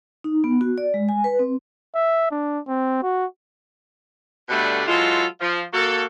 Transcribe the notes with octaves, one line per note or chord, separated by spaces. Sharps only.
D#4
B3
F#4
D5
G#3
G#5
B4
C4
E5
D4
C4
F#4
B2 D3 G3 A3 D4 B4
E3 F#3 G#3 F4 A4 C5
F3
A#3 F#4 A4